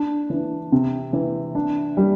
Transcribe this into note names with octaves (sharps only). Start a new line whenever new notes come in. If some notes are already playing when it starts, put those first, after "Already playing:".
Already playing: D4
E3
C3
E3
D4
G3